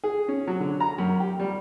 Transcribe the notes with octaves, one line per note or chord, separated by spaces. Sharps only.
G#4
C#4
F#3
D3
A#5
F#2
G4
G3